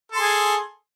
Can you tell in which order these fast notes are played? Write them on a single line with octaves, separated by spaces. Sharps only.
A4 C6 G#4